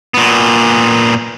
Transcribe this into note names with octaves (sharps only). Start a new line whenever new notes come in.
A#2 B3